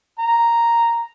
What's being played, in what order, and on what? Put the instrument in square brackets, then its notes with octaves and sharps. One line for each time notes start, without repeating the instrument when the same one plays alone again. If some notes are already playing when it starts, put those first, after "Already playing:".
[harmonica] A#5